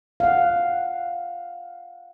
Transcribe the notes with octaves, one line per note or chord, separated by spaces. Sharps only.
F5 F#5